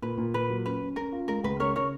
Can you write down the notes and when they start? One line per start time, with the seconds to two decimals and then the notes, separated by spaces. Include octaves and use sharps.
0.02 A#2 B4
0.18 A#2
0.34 A#2 B4
0.50 F#3
0.65 C#4 B4
0.82 C#4
0.96 C#4 A#4
1.12 F4
1.28 G#3 A#4
1.43 C#2 B4
1.60 C#3 A#4 C#5
1.76 C#3 A#4 C#5